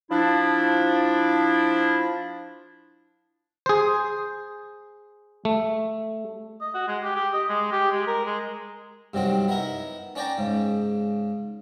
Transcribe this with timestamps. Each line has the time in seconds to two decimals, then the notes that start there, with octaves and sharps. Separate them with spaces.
0.10 F3 D4 E4
3.66 G#4 C5
5.45 A3
6.61 D#5
6.74 F#4
6.88 G#3
7.03 G4
7.15 G4
7.33 D#5
7.49 G#3
7.72 G4
7.92 G#3
8.07 A#4
8.26 G#3
9.14 G2 C3 D#3 F#3 C4 D4
9.48 B3 D#4 E4 A#4
10.15 C#4 D4 C#5 D5 G5 A#5
10.38 G#2 C#3